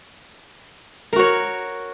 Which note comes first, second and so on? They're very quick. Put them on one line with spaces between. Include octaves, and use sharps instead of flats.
A#4 F#4 C#5